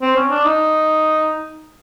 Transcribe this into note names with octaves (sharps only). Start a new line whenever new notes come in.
C4
C#4
D4
D#4